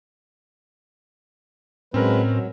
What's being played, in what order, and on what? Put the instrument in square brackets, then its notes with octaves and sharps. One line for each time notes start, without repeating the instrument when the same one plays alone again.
[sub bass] A2 [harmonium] F#3 G#3 B4 [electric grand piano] C4 C#4 A#4
[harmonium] F#3